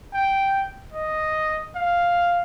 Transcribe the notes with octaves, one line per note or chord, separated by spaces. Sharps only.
G5
D#5
F5